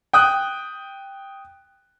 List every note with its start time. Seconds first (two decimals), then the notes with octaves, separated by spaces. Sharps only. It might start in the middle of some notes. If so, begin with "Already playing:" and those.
0.13 G5 D#6 F#6